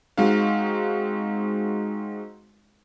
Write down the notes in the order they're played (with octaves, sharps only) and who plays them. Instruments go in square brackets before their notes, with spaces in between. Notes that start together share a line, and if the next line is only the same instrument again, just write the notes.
[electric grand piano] G#3 C4 D#4 F#4 F5